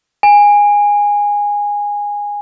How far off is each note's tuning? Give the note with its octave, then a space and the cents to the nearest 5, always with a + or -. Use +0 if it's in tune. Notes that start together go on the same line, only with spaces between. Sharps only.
G#5 -15